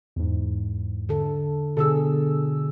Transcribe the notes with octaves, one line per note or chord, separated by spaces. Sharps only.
E2 G#2
D3 A4
B2 D3 G#4 A4 E6